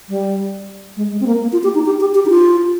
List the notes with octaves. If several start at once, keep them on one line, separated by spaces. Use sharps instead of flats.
G3
G#3
G#3
C4
A#3
A#3
F4
G4
D#4
G4
G4
G4
D#4
F4